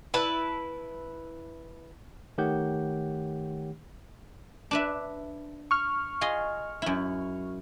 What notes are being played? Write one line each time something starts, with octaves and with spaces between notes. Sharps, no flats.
E4 B4 A5
D#3 A3 G4 C#5 F#5 G6
D4 B4 E5
C#6 F6
F4 G#4 D#5
F#2 E4